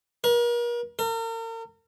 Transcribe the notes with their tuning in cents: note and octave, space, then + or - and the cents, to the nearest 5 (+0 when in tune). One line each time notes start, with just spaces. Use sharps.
A#4 +40
A#4 -40